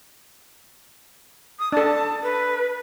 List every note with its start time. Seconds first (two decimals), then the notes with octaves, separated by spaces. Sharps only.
1.59 D#6
1.72 D4 A4 A5
2.23 B4